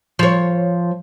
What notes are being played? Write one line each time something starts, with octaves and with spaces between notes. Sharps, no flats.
F3 C#5